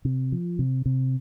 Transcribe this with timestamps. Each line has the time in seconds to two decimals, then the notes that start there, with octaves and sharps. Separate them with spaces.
0.05 C3
0.32 F3
0.59 C3
0.86 C3